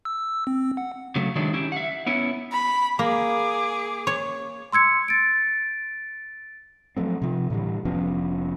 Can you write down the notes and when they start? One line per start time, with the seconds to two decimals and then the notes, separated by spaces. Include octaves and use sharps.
0.05 E6
0.47 C4
0.77 F#5
1.16 C#3 F#3 A3
1.36 D#3 F#3 G#3 C4 D4 E4
1.53 C#4 E4 G4
1.72 E5 F#5
2.06 B3 C#4 E4
2.52 B5
2.99 A#3 G#4 D6
4.07 C#5
4.72 C6 E6 G#6 C#7
5.08 A6 D7
6.97 F3 F#3 A3 C4
7.22 C3 F3
7.50 A2 D3 E3 G3
7.85 F1 F3 B3 C#4